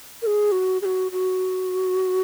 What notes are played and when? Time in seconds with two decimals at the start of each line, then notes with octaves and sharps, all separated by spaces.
0.22 A#4
0.27 G#4
0.52 F#4
0.82 G#4
0.85 F#4
1.12 F#4